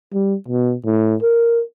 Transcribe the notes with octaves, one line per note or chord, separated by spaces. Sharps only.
G3
B2
A2
A#4